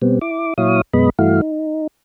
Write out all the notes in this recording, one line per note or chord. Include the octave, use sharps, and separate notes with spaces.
B2 G3 B3 C4
E4 D6
A#2 F#3 E4 C#5 F5 D#6
F#2 B2 G#3 B3 D#5 B5
G2 E3 A3 E4 F#4 F5
D#4